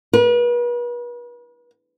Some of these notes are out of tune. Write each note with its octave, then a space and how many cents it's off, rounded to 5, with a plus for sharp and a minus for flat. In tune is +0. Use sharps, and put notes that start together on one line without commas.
B4 -40